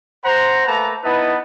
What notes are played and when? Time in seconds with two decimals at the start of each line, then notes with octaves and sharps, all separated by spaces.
0.24 C5 F#5 A#5
0.66 A3 A#3 B4 A5 A#5
1.03 B3 D#4 E4 B4 D#5 A5